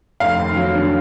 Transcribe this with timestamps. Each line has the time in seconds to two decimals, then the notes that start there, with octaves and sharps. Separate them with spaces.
0.20 F1 F5
0.39 D#2
0.56 F#3
0.75 D3